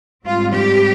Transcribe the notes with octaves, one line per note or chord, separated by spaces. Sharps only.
G#2 G3 C4 F4
G4